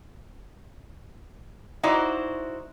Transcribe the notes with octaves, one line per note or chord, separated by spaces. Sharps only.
D#4 E4 F#4 C5 D5